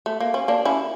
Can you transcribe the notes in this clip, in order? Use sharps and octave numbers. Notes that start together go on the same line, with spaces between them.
A3
A#3
C#4
A#3 D4
C#4 E4